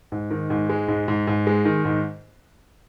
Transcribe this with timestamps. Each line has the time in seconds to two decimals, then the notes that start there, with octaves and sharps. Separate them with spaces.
0.12 G#2
0.31 D#3
0.50 G#2
0.69 G#3
0.88 G#2
1.08 G#2
1.27 G#2
1.47 G#3
1.65 D#3
1.85 G#2